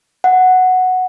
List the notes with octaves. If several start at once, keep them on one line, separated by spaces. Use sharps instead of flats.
F#5